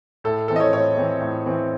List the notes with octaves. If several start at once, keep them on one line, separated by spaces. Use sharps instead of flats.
A2 A4
E3 C4 A4
D#5
C#5
A2 C#5
E3 C4
A2
E3 C4